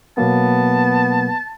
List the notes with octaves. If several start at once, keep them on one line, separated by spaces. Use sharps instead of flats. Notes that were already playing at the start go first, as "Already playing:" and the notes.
B2 F#3 A#3 B3 A5